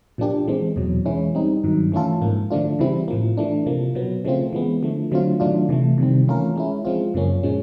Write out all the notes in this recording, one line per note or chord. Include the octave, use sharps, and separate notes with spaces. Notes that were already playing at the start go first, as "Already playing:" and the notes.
A#2 F3 A#3 D4 G4
E3 G#3 C4
E2 B2 F#3
E3 G#3 C#4 E4
G3 C4 D#4
G2 D#3 F#3
E3 A3 C#4 F4 A4
G#2 F3 A#3
D3 F3 A3 D4 F4
C#3 E3 G3 C4 E4
A2 F3 A#3
E3 A3 D4
C3 F3 A#3
B2 F#3 B3
C#3 F3 A3 C4 F4
E3 G#3 B3
D3 F3 A3
D3 F#3 A3 C4 F4
D#3 F#3 A3 D4 F4
C3 E3 A3
C3 D#3 G3 C4
E3 A3 C#4 F4 A#4
G#3 C#4 E4
F3 G#3 C4 F4
F#2 C#3 F3 A#3 C#4
A#2 F3 G#3 C#4